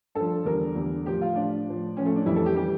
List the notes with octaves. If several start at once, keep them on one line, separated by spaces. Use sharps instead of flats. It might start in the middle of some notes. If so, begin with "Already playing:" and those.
G2 F3 A4
E2 D3 G3 A#4
E2 D3 G3
A2 F3 G4
F4
A2 F3 D4
A2 F3
A2 F3 C#4
A3
D4
F2 E3 G3 E4
A4
G4
E3 G3 G4